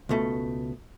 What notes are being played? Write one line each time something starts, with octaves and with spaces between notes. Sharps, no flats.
C#2 B2 A3